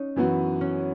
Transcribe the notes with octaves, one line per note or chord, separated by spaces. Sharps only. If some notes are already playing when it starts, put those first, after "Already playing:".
Already playing: C#4 D#4
F#2 E3 B3 F#4
C#4